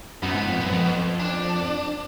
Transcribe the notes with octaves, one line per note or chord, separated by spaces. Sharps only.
F#2 B3
G#2
F2
F#2
F2
D4